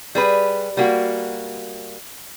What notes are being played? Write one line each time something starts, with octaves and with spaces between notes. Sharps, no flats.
G3 G#4 B4
G3 A#3 F#4